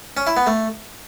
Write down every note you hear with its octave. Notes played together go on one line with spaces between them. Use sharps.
C#4
E4
B3
A3